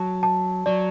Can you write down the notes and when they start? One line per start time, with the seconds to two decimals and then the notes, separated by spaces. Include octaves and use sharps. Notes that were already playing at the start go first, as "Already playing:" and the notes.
Already playing: F#3 A5
0.23 A5
0.66 F#3 D5